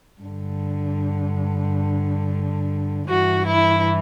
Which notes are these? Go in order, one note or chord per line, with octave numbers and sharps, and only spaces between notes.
G2 D3
G2 E3 F#4
E4